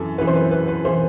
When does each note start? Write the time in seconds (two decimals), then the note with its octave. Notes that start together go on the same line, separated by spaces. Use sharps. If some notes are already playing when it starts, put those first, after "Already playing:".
Already playing: F#2 E3 A4
0.18 F#2 E3 B4
0.27 C5
0.35 B4
0.51 B4
0.68 B4
0.85 E3 C5